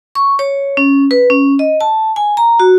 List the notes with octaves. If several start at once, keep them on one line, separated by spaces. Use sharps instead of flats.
C#6
C#5
C#4
B4
C#4
D#5
A5
G#5
A#5
F#4